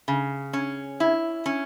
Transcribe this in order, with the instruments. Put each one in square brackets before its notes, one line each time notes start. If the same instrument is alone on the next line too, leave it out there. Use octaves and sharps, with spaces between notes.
[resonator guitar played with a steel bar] C#3
C#4
E4
C#4